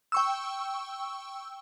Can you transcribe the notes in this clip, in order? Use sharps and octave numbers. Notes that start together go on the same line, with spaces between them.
G5 C#6 E6